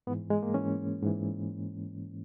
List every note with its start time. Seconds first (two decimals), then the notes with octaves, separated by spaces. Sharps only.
0.07 G#2 B3
0.10 E3
0.30 G#3
0.43 A#3
0.54 G#2 E3 C#4
1.02 G#2 E3